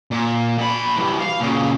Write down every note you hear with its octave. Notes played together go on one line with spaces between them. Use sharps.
A#2
A#2 B5
E3 G3
F5
A#2 C#3